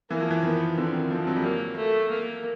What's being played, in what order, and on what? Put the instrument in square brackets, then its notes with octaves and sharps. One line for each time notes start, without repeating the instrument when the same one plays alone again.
[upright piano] E3 [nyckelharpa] A#3
[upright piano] F3
E3
[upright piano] D#3 [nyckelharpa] B3
[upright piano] D3 [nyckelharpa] C4
[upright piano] D#3
[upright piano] F3 [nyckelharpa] C4
[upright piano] F#3
G3
[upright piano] F#3 [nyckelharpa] A#3
[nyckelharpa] A3
A#3